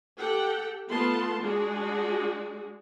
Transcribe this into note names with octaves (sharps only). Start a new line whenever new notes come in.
G4 A4 F#5 G5
A3 B3 F4 A5 C6
G#3 D4 F#4 G#4